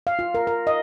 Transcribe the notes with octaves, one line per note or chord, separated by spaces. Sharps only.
F5
F4
A#4
A#4
D#5